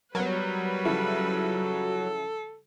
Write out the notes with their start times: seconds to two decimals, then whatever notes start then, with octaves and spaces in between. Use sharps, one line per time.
0.15 F#3 G3 B3 A#4 B4
0.85 C#3 F3 E4 A4